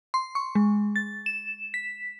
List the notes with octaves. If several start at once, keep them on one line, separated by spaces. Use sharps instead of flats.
C6
C#6
G#3
A6
E7
B6